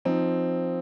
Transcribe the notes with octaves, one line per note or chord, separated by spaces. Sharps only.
F3 C4 D#4